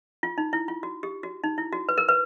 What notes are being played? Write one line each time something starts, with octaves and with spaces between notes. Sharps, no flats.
F4
D#4
E4
F4
F#4
G4
F#4
D#4
E4
F#4
B4
A#4
B4